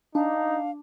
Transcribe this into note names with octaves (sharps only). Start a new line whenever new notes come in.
D4 D#4 F5